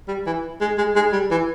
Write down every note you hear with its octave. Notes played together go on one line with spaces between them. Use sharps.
G3
E3
G#3
G#3
G#3
G3
E3